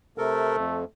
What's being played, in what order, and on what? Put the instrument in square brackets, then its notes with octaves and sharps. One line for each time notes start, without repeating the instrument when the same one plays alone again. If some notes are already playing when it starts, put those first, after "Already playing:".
[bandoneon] C3 A4 A#4 [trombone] A3
[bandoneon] F2